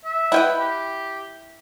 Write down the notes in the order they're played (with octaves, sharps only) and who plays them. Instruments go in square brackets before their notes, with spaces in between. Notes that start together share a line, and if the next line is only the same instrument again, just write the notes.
[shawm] E5
[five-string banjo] E4 G5 [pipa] B4 D#5 F#5
[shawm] G4